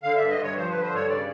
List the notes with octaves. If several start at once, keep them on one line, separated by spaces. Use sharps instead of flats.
D3 F5
G2 E5
D#5
G2 C#5
F3 C5
D3 B4
C5
G2 C#5
C#3 D5